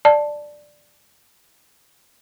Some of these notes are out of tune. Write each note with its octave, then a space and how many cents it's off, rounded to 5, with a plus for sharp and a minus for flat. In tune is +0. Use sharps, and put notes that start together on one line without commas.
D5 +5 A5 +0